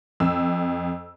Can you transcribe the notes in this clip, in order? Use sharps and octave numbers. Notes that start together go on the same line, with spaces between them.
F2 E6